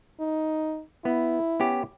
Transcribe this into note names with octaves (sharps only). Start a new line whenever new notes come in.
D#4
B3 E4
B3 C#4 G4